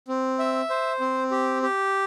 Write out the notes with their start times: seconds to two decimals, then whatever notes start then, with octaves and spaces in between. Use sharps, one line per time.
0.08 C4
0.39 E5
0.70 C5
1.00 C4
1.31 G4
1.62 G4